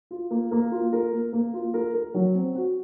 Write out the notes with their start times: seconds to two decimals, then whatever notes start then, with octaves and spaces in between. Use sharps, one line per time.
0.11 F4
0.31 A#3
0.52 A#3
0.72 F4
0.93 A#4
1.12 A#3
1.33 A#3
1.54 F4
1.74 A#4
1.94 A#4
2.14 F#3
2.35 C4
2.55 F#4